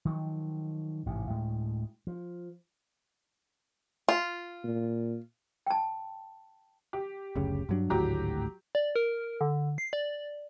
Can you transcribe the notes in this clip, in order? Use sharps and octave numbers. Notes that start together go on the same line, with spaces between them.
D#3 F3 F#3
A1 G#2 C3
D2 A2 G#3
F3
F4
A#2
G5 A5
G4
F#1 D2 C#3
G2 F#3 D4
G#1 D2 A2 F#3 G4 A#5
D5
A#4
D3
C7
D5